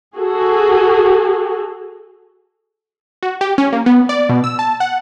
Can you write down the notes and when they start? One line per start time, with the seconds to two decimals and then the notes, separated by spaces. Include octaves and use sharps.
0.17 F#4 G#4 A4
3.23 F#4
3.41 G4
3.58 C#4
3.73 A#3
3.86 B3
4.09 D5
4.29 B2
4.44 E6
4.59 A5
4.80 F#5